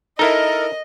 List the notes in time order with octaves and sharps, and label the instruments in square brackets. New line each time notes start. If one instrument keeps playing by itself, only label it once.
[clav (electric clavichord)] D#4 E4 [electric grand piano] A4 A#4 [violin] D#5